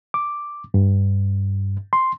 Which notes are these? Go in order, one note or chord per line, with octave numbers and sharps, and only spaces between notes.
D6
G2
C6